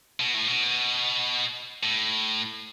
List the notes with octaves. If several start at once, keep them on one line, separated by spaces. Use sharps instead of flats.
B2
A2
B2
A2